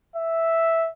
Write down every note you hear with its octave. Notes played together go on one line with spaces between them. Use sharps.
E5